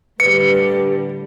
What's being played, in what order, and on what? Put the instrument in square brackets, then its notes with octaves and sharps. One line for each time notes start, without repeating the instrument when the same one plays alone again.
[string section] A2 D3 G3 [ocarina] B4 [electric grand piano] C#7